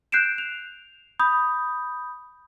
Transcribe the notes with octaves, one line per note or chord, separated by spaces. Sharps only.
F#6 G6 C7 D7 E7
F7
B5 D#6 G6